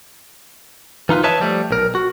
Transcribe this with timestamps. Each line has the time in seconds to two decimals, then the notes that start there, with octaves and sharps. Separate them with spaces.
1.09 E3 D#4 F4 B4
1.23 B4 C#5 D#5 E5 A5
1.40 F3 G3 A3
1.71 B1 A#4
1.95 F#4